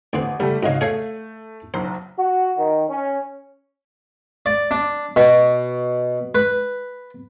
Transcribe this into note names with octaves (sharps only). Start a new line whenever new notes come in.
A1 D2 C4 B4
C#2 G3 A3
G#2 C#3 F#4 D#5 F5
A3 G#4 C#5 F5
F#1 B1 C5
F#4
D#3
C#4
D5
D4
B2
B4